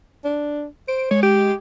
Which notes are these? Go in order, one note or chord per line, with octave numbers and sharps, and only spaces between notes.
D4
C5 D7
G#3 C#5
G4